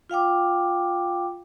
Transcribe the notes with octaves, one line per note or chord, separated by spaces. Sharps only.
F4 F5 G5 D6